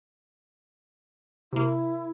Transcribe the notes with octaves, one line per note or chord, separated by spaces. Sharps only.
C3 A#3 E4